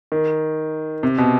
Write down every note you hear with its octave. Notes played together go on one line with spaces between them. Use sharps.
D#3
C3
B2